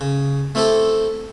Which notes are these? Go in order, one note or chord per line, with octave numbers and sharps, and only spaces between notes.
C#3
A3 C4 E4 G4 A4